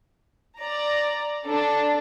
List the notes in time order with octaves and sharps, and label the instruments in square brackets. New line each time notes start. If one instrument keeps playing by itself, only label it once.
[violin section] D5 A#5
D4 A4